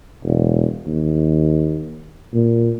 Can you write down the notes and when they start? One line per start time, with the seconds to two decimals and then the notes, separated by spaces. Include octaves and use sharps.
0.23 E1
0.87 D#2
2.34 A#2